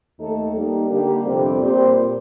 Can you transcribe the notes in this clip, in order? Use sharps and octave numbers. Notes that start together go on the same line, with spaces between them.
D#2 D#3 A3 D#4 A4
G3 A#3 D#4
D3 G3 A#3 D4 G4
F2 C3 G3 C4
A#2 G3 C4 G4 C5